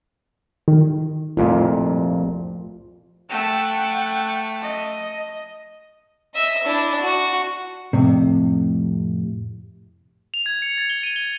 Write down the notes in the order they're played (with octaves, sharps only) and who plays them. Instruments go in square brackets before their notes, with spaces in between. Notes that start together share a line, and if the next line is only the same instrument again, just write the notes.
[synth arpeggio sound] D#3
[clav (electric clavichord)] C2 F2 A#2 [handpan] F3 A3 F4
[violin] A3 [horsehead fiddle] F#5 G5
[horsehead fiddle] D#5
[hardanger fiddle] D#5 E5
D4 E4
F#4
[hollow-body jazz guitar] F2 A2 C3
[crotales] F7
G#6
C#7
A6
G7
D#7
G7